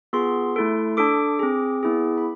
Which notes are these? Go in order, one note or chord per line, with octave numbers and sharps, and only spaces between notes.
B3 F4 G#4 C6
A3 E4 A4
D4 A4 D6
C4 G#4
B3 E4 G#4
B5